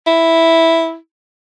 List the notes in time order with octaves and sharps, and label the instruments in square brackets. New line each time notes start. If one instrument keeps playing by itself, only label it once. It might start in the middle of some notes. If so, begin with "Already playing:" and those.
[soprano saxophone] E4